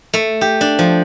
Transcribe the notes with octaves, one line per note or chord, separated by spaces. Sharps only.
A3
G4
D4
F3